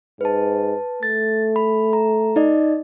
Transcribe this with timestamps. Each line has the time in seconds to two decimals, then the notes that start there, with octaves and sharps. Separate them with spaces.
0.21 G#2 B4 A5
1.03 A3 A6
1.56 B5
1.93 A#5
2.36 D#4 D5 D#5